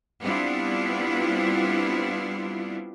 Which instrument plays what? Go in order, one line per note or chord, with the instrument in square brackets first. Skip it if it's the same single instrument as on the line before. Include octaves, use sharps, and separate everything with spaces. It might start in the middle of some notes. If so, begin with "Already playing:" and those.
[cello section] G3 B3 C4 D4 E4 F4